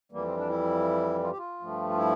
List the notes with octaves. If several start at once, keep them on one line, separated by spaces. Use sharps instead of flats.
F2 E3 G3 A#3
C4
D4
E4
F4
G4
F4
G2 F3 A3
F4
E4